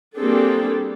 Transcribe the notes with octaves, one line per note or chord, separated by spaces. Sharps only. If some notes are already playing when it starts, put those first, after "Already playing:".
G3 A#3 C4 D4 G#4 A4